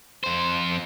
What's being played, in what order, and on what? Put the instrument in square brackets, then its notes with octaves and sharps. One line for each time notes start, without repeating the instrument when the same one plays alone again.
[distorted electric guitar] F2 C5